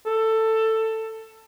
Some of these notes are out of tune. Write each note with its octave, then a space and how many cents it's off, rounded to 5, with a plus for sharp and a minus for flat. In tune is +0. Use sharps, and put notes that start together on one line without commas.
A4 +15